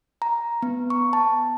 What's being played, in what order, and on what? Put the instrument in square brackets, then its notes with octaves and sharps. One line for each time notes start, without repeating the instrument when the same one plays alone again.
[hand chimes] A#5
B3
C#6
A5